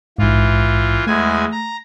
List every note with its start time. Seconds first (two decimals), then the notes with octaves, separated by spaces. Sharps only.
0.18 A#1 G#2 E3 F4
1.07 E2 G#3 A3 G#5
1.52 A#5